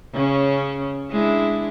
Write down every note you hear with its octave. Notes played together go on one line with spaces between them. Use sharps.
C#3 C#4
G#3 D4 E4